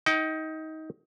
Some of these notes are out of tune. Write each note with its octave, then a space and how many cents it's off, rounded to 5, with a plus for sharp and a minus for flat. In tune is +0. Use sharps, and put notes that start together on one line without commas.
D#4 +20 G5 -30